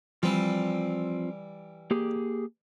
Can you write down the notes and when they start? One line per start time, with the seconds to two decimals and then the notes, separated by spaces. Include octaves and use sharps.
0.23 E3 F3 G3 C4
1.91 A#3 G4 G#4